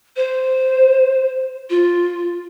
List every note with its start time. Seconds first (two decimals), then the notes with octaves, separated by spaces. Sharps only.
0.16 C5
1.70 F4